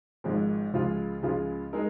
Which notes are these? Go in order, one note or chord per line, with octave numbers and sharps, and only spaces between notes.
G#1 G#2 F3 G#3
C#2 C#3 F3 G#3 F4
C#2 C#3 F3 G#3 F4
G#3 D#4 A#4